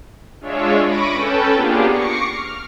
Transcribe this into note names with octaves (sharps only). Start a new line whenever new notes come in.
G#3 D4 F4 C#5 E5
B5 C#6 D6 A#6 D7 D#7
C#4 A4 B4 G5 A5
A#3 B3 D4 F4 G4 G#4
C#6 D6 A#6 C7 C#7
F6